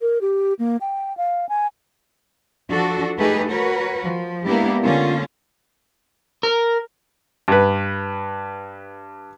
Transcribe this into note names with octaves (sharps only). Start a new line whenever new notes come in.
A#4
G4
A#3
G5
F5
G#5
F3 D4 F#4 A4
A3 D#4 G4 G#4 B4
F#4 A#4 B4 C#5
F3
G#3 A#3 B3 D4 E4 G4
D3 A#3 C#4 F4
A#4
G2 B4